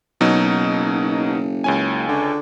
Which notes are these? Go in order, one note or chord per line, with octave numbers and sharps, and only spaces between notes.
F#1 B2 F#3 D#4
C#2 C#4 G#5
D3